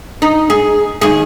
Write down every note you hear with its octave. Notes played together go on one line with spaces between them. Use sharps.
D#4
G#4
D#2 G#4